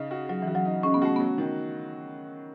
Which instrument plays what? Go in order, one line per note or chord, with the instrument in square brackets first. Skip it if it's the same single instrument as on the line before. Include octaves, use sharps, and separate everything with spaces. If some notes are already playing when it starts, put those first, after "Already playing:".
Already playing: [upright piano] C#3 D#4
F#4
[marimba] F#3 [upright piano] F#4
[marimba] E3
[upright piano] F#4
[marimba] F#3
[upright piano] D#4
[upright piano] G#3 [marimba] C#4
[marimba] B3
[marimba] A3 [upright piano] F#4
[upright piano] F#3 [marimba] B3
[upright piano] D#3